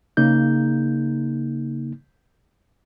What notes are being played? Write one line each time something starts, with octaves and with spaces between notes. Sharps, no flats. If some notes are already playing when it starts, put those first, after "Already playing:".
C#3 A#3 D#4 G6